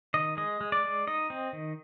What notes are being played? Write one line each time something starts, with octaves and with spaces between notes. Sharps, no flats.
D#3 D#5
G#3 D#5
G#3
D5
G#3
D#4 D#5
C4
D#3